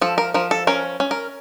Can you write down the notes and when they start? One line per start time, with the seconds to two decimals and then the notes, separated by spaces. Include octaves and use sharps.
0.01 F3 A4
0.18 A#4
0.34 F3 A#4
0.51 A4
0.67 C#4 A#4
1.00 C#4
1.11 A#4